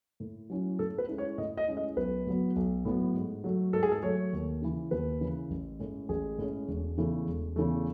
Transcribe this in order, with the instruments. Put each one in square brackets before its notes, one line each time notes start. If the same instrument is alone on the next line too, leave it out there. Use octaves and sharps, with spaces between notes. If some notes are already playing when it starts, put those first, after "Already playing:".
[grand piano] A2
F#3 C#4 E4
A2 A4
B4
G#3 C#4 E4
C#5
A2 D#5
D#5
G#3 C#4 E4
D#5
B1 B4
A2 F#3 B3
B1
A2 F#3 B3
G#2
F#3 A3
G#2 A4
G#4
A4
F#3 A3 C#5
D#2
C#3 E3
D#2 B4
C#3 E3
A1
A2 G#3 C#4
A1 G#4
A2 G#3 C#4
E1
E2 C#3 E3 A3
E1
E2 C#3 E3 A3